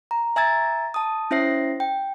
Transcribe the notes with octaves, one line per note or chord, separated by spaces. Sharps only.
A#5
E5 G#5 A#5 E6 G#6 A6
A5 D#6
C#4 E4 C5 E5 A#6 C7
G5